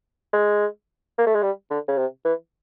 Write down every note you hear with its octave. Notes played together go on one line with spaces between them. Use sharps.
G#3
A#3
A3
G#3
G3
D3
C#3
C3
E3